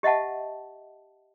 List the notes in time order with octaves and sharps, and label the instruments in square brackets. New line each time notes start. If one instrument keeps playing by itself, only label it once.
[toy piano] G4 D#5 E5 F#5 A5